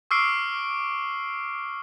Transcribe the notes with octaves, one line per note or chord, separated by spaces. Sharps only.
C#6 D6 E6 F6 C7 D7